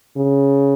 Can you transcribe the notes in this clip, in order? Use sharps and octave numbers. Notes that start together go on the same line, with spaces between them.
C#3